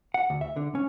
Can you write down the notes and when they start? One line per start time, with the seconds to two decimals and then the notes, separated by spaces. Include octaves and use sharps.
0.14 F#5
0.30 D2
0.41 E5
0.56 D3
0.75 C#4